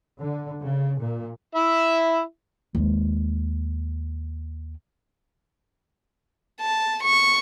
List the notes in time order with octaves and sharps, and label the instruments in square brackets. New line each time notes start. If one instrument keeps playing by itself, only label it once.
[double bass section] D3
C#3
A#2
[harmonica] E4 E5
[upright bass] D#2 G#3
[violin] A5
C#6